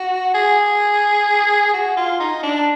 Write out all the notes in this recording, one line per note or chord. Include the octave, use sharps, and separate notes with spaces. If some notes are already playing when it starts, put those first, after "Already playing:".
Already playing: F#4
G#4
F#4
F4
D#4
D4